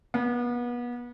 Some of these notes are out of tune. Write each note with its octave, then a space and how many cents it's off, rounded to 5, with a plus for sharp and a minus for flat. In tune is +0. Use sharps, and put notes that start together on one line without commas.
B3 -30